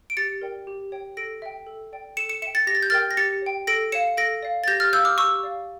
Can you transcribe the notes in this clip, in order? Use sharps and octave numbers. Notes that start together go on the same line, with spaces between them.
D7
G4 A6 C#7
A#4 D5 G5
G4
C#5 G5
A4 A#6 D7
E5 G5
A4
D5 G5
A4 C#7 E7
C#7 E7
E5 G5 C#7 E7
A6 C#7
G4 A#6
A6
G6
A#4 E5 G5 F6 A6
A#6
G4 A6 C#7
C#5 G5
A4 A#6 D7
C#5 F5 C#7 E7
A4 A#6 D7
D5 F5
A6
G4 G6 A#6
F6 A6
C#5 F5 E6 G6
D6 F6
G4 C#6 E6
D5 F5